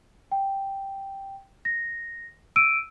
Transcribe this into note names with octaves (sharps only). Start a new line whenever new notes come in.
G5
A#6
E6 D7 D#7